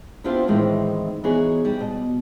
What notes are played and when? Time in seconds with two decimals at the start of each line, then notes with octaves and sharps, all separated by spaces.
0.24 B3 C4 D4 E4 F4 G4
0.48 A2 D#3 E3 G#3 C4
1.24 E3 B3 D#4 F#4 G#4 C#5
1.65 G3
1.81 B2